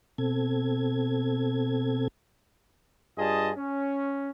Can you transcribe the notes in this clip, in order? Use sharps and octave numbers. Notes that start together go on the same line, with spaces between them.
B2 C4 A4 G#6
G2 G3 F4 G#4 D#5 A5
C#4